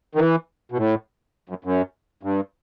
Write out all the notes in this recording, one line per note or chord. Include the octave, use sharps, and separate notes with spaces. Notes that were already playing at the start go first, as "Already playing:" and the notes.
D#3
E3
B2
A2
F#2
F#2
G2